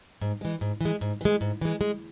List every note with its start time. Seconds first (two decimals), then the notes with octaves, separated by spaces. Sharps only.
0.21 G#2
0.41 E3 G#3
0.61 G#2
0.81 E3 G#3
1.01 G#2
1.21 E3 G#3
1.41 G#2
1.61 E3 G#3
1.81 G#3